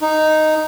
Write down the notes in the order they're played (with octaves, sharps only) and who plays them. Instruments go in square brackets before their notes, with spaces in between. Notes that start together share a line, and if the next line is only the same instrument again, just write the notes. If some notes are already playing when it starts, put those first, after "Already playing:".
[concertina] D#4